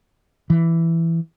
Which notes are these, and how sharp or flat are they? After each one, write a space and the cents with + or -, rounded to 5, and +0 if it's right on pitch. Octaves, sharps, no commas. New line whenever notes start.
E3 +5